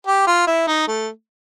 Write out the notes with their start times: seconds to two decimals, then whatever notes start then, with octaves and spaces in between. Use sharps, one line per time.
0.07 G4
0.27 F4
0.47 E4
0.67 D#4
0.88 A3